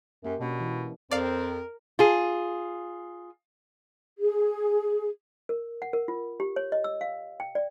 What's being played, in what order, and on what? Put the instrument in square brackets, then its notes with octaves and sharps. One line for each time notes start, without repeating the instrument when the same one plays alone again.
[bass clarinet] F#2 [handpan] A#3 G4
[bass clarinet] B2 [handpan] A#3 C#4 D4
[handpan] E3
[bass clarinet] F2 [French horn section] C4 [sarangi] A#4 [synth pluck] D5 F5
[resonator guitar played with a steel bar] F4 G#4
[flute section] G#4
[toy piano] A#4
F#5
A#4
F4
G4
C#5
D#5
E6
F5
G5
D5